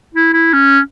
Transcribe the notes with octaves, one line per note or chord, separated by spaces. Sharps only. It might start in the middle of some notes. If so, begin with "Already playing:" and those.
E4
E4
C#4